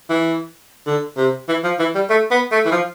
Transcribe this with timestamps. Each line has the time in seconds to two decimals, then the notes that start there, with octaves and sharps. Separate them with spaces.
0.10 E3
0.87 D3
1.17 C3
1.48 E3
1.64 F3
1.79 E3
1.95 G3
2.10 A3
2.31 B3
2.52 A3
2.66 E3
2.72 F3